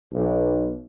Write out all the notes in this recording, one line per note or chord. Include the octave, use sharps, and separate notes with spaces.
B1